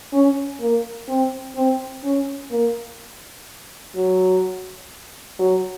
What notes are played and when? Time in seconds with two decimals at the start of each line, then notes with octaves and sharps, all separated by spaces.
0.13 C#4
0.61 A#3
1.09 C4
1.56 C4
2.04 C#4
2.51 A#3
3.95 F#3
5.39 F#3